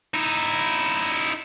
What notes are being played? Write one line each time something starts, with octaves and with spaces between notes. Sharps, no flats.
D#4 E4